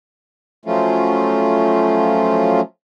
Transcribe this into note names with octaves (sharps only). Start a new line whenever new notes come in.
F3 F#3 A3 C#4 F4